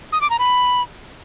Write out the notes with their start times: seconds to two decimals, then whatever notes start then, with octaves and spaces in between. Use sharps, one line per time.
0.12 D#6
0.21 D6
0.30 A#5
0.39 B5